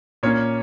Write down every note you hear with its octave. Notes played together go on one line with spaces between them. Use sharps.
A#2 A#3 C#4 C#5